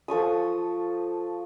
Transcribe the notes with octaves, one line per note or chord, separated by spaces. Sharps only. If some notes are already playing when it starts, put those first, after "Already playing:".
F3 A4 C#6 D#6